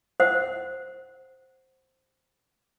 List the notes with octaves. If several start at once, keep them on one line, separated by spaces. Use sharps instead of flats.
C5 F#5